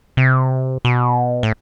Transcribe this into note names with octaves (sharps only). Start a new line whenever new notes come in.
C3
B2
A2